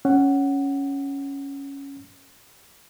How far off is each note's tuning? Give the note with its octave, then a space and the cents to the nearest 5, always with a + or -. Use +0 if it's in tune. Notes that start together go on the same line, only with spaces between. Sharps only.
C#4 +0 F#5 +10